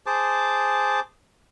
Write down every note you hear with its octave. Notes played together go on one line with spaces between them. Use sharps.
G#4 C5 A5 D6